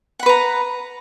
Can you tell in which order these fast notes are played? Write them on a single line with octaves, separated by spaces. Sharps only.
F#5 B5 B4 A#5